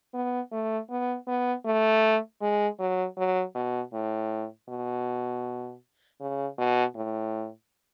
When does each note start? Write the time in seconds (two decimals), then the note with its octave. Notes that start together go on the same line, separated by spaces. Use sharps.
0.14 B3
0.52 A3
0.90 B3
1.27 B3
1.65 A3
2.41 G#3
2.79 F#3
3.17 F#3
3.55 B2
3.93 A2
4.69 B2
6.20 C#3
6.58 B2
6.95 A2